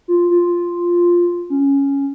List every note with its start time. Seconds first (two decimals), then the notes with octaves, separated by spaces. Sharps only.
0.08 F4
0.31 F4
1.50 C#4